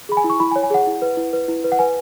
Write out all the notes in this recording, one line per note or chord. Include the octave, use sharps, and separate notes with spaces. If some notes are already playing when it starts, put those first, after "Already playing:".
G#4 B5
G#5
E4
C#6
E4 B5
G#5
C#5
G#5
G#4 F#5
E4
B4
E4
B4
E4
B4
F#5
B4 G#5